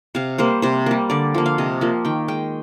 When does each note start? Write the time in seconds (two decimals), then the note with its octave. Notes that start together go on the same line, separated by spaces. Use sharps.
0.15 C3 F5
0.38 G3 A#3 C5
0.62 C3 C5
0.86 G3 A#3
1.10 D3 D5
1.34 F3 A#3
1.46 F5
1.58 C3 D#5
1.81 F3 A#3
2.05 D#3 G5
2.28 G#3 G5